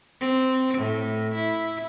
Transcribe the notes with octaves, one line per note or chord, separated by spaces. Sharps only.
C4
A2
E4